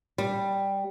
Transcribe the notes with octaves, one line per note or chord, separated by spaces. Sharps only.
G3